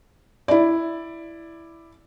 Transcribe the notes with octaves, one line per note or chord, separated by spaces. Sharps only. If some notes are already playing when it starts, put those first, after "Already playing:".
E4 D5